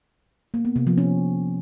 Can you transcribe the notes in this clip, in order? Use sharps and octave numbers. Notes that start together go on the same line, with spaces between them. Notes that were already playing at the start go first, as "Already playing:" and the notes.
A#3
B3
C3
F3
C#4